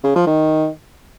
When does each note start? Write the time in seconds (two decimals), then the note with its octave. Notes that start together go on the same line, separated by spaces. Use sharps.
0.04 C#3
0.15 F3
0.27 D#3